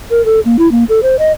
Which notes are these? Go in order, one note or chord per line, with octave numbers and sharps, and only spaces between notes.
A#4
A4
A#3
E4
A#3
A4
C5
D#5